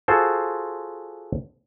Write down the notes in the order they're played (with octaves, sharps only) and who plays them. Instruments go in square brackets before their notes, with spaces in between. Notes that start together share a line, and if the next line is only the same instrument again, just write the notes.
[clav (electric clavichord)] F4 F#4 G#4 A4 C5